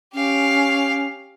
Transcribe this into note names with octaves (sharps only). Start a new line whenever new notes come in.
C#4 G4 F5